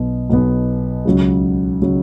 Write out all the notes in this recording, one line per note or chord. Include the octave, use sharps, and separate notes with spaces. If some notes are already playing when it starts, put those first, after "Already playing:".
Already playing: B1 B2 B3
B1 B2 B3
C#2 C#3 F#3
C#3 F#3